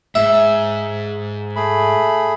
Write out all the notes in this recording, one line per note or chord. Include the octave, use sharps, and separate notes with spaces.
G#2 E5
A3 G#4 B5